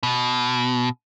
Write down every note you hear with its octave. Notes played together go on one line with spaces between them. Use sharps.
B2